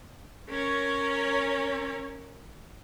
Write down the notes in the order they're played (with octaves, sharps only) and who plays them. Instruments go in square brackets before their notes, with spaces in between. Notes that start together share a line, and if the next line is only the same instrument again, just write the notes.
[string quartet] C#4 A#4 C#5